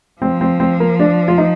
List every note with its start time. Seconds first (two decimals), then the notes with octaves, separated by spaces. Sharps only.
0.21 F3 C4
0.41 C4
0.60 C4
0.80 A#3
0.99 D4
1.28 F4
1.38 D#4